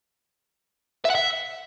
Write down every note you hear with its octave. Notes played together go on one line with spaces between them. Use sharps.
E5
F#5
E5